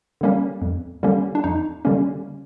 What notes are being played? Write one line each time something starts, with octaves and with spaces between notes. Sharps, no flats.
D3 G3 A#3 C#4
F2
D3 G3 A#3 C#4
D4
F2 D#4
D3 G3 A#3 C#4